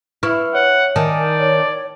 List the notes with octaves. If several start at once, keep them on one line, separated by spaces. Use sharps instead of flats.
E4 B4 C#6 F6
C#5 F#5
D#3 D5 G#5 A5
C#5